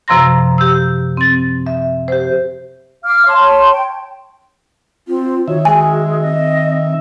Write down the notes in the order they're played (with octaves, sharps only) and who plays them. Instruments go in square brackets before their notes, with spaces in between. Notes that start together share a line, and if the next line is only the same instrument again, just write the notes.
[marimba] F#2 C3 F3 A#5 C6 A#6
G4 E6
C4 A6
E5
G4 C5
[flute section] F5 D6 F6
C#5 A5 C6
G5
[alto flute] C4 [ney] F4
[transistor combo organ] D#3 E5 [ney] F#4 [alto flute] C#5
[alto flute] G#3 [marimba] G#5
[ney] C4 [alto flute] D#5